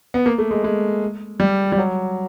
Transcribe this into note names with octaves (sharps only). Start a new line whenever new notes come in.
B3
A#3
A3
G#3
G#3
G3
G3
F#3